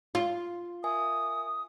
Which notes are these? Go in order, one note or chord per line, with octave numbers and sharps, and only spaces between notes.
F4
A#4 E5 G#5 D#6